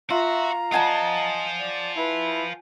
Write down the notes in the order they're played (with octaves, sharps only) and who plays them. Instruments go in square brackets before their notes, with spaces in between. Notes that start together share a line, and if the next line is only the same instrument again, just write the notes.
[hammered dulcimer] F4 [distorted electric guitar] F#4 [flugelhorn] E5 [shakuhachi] A#5
[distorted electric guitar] F4 C5 [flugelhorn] D#5 [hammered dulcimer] F#5 G#5 A5
[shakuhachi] D5
[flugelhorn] E4 [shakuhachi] B4